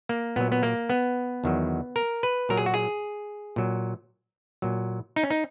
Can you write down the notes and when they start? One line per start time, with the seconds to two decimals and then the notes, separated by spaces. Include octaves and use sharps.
0.09 A#3
0.36 A#2 F#3 B3
0.52 B3
0.63 A#3
0.90 B3
1.44 E2 D#3 F#3
1.96 A#4
2.23 B4
2.49 A#2 F#3 A#4
2.57 G#4
2.66 F#4
2.74 G#4
3.56 A#2 F#3
4.62 A#2 F#3
5.16 D#4
5.23 C#4
5.30 D#4